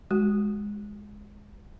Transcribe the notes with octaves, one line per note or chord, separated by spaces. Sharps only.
G#3 F#4